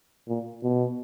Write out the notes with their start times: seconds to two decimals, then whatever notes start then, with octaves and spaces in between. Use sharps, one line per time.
0.28 A#2
0.63 B2